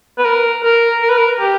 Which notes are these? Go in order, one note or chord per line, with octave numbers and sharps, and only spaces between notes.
B4
A#4
A#4
A#4
B4
A#4
G4